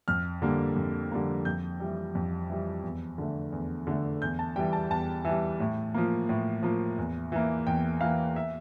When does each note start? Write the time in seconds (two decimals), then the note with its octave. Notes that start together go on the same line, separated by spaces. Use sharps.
0.08 F2 F6
0.42 D3 G3 A#3
0.76 F2
1.12 D3 G3 A#3
1.45 F2 G6
1.80 E3 G3
2.15 F2
2.50 E3 G3
2.83 E2
3.18 D3 A3
3.52 E2
3.87 D3 A3
4.22 E2 G6
4.39 A5
4.56 E3 G3 G5
4.73 A5
4.90 E2 A5
5.25 E3 G3
5.60 A2
5.94 F3 A#3
6.29 A2
6.63 F3 A#3
6.98 E2
7.32 E3 A#3
7.67 E2 G5
8.01 E3 A#3 F5
8.36 E5